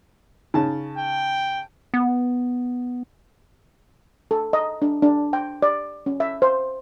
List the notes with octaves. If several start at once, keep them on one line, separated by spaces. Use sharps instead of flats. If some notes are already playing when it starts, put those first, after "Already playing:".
C#3 C#4 D#4 A5
G5
B3
A4
D#5
D4
D4
G5
D5
C#4
E5
C5